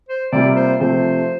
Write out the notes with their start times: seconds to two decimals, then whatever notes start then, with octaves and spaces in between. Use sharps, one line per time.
0.09 C5
0.32 C3 G3 A#3 F4 D5
0.57 C5
0.80 C3 F3 A3 C4 C5